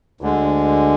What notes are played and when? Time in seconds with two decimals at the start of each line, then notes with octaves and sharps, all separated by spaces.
0.21 D2 D3 G#3